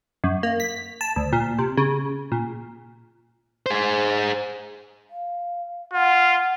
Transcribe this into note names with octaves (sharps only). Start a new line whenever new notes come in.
F#2
A#3
B6
A5
D2
A#2
C3
C#3
A#2
G#4 C5
F5
F4 F#5